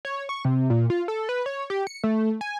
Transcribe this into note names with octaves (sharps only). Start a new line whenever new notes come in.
C#5
C#6
C3
A#2
F4
A4
B4
C#5
G4
C#7
A3
G#5